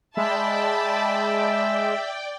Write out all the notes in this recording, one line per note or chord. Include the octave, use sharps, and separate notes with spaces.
G#3 D5 E5 G5 A5 B5